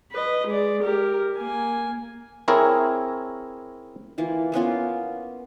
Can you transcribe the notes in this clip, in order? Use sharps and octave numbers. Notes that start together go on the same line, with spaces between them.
B4 D#5
G#3 D5
G4 A#4
A#3 G#5
C4 E4 G#4 A#4 C#5
E3 A#3 F4
A#3 B3 C#4 F4